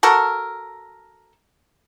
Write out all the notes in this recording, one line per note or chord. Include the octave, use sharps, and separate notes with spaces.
F#4 A4 A#4